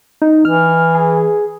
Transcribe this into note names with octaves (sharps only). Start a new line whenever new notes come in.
D#4
E3 F6
G#4